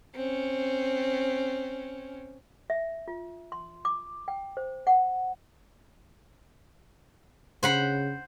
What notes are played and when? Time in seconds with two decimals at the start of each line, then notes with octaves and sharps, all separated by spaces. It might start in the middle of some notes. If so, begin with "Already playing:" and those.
0.15 C4 C#4
2.70 E5
3.08 F4
3.52 C6
3.85 D6
4.28 G5
4.57 C5
4.87 F#5
7.63 C#3 C5 F#5 B5